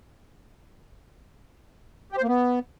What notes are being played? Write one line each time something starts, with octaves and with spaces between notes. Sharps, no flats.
G4
C5
A#3
B3